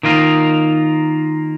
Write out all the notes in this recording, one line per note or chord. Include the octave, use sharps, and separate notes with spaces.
D#3 A#3 F4 A#4